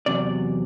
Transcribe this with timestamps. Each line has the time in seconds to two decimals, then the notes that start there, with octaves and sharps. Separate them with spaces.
0.06 E2 C3 F#3 D5